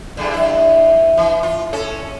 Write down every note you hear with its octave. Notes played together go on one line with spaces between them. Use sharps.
E2 G2 D3
G2 E4
E3
F4
C#4 A4